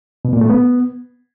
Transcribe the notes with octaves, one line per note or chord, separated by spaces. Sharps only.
B2
A#2
A3
B3